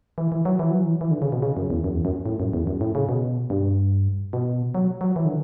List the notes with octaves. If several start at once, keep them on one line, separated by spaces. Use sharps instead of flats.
E3
E3
F#3
E3
F#3
E3
E3
D3
C#3
B2
C#3
F#2
E2
F#2
E2
F#2
A2
F#2
E2
F#2
A2
C#3
B2
G2
B2
F#3
F#3
E3
D3